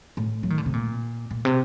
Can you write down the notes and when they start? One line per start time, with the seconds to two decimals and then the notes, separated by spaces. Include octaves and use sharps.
0.17 A2
0.43 F#3
0.50 D#3
0.58 D3
0.66 C3
0.73 A#2
1.31 A#2
1.45 C3